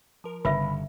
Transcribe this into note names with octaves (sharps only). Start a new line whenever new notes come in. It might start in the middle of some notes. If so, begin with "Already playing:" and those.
F3 A#4
G1 C#3 B4 E5 B5